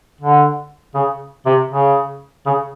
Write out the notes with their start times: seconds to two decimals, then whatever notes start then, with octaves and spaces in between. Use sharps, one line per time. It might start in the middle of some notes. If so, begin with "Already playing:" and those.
0.21 D3
0.95 C#3
1.46 C3
1.71 C#3
2.46 C#3